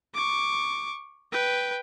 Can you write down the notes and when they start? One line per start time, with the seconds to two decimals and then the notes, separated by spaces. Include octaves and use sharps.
0.14 C#6 D6
1.32 B4 G5